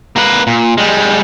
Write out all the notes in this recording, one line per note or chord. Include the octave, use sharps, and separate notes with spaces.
A#3 B4
A#2
G3 G#3